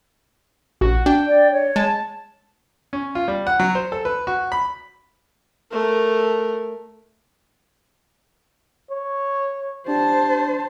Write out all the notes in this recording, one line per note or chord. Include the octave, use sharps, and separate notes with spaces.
A#1 F#4
D4 G5
D5
C#5
G#3 A5
C#4
F4
G3
F#5
F#3
C5
A4
B4
F#4
B5
A3 A#4
C#5
D4 G4 C5 A5